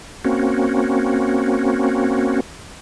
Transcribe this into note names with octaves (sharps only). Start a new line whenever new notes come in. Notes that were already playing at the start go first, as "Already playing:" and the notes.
A#3 C4 C#4 F#4